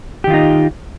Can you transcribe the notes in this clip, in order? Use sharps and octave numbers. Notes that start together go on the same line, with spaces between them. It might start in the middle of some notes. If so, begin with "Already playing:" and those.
D#3 D#4 F4 G4